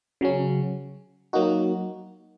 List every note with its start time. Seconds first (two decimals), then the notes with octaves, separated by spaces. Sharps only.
0.21 C#3 F#3 C#4
1.33 F#3 A#3 D#4 F#4